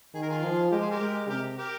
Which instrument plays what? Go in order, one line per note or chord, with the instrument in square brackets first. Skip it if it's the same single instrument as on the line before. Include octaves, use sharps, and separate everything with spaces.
[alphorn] D#3 [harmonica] G#4
[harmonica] A#4
F4 G#4
[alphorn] F3
[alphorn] G#3 [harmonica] G4 A#4
[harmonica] G#4 C5
G4 A#4
[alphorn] G#3
[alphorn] C3 [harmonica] G4 A#4
[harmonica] G4 A#4